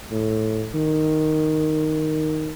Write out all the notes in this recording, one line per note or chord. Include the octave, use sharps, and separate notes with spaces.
A2
D#3